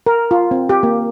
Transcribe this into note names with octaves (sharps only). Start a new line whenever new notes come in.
A#4
F4
C4
G4
A#3